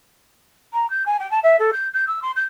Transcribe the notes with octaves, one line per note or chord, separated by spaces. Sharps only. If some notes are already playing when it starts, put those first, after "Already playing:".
A#5
G6
G#5
G5
A5
E5
A4
G6
G6
E6
C6
G6